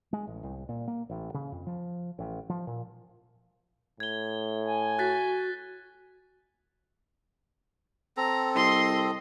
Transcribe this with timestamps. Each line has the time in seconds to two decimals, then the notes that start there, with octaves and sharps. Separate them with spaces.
0.13 G#3
0.27 A1
0.43 C2
0.69 A#2
0.88 A#3
1.09 A1
1.34 C#3
1.52 F2
1.67 F3
2.19 A1
2.49 F3
2.67 A#2
4.00 A2 G#6 G7
4.65 G#5
4.99 F#4 F#6 A6 B6
8.17 C4 A4 A#5
8.56 C2 D#5 C6